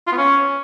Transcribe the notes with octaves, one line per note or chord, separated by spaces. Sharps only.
F4
B3
C#4